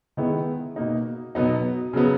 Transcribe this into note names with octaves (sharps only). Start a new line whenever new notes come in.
D#3 G#3 B3 E4
B2 A#3 D#4
B2 F#3 B3 D#4
C#3 F#3 B3